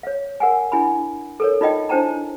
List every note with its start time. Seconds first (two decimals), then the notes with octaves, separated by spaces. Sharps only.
0.03 C#5 F5
0.40 A#4 F#5 G#5
0.72 D4 E4 G#5 B5
1.40 A4 A#4 C#5
1.61 D#4 F4 D5 D#5 G5
1.89 D4 E4 C5 G5 A5 A#5